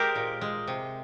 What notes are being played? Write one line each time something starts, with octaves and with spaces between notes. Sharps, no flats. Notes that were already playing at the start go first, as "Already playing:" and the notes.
Already playing: G#3 G4 A#4 C5
A#2
G#3
C3